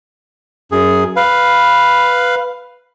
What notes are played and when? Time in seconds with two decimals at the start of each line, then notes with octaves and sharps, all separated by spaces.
0.72 F#2 G#4
1.16 B4 F5